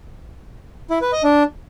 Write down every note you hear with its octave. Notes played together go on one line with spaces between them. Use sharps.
E4
B4
D#5
D4